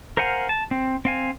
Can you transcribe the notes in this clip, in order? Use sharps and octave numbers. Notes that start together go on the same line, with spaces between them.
A#4 C5 F5 F#5 G#5
A5
C4
C4 F5 G#5